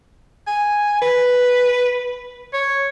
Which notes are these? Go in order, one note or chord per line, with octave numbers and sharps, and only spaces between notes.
G#5
B4
C#5